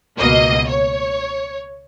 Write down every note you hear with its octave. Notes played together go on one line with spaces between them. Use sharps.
C#2 B2 A#3 D#5
C#5